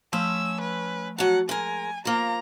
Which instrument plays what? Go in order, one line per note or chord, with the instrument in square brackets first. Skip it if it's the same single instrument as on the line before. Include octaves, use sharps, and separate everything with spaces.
[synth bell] F3 A3 [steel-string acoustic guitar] C#4 [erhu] E6
[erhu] B4
[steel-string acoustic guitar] F#3 A5 [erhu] F#5
[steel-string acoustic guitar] G#3 A#4 [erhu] G#5
[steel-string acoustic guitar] F3 A#3 [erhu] A#5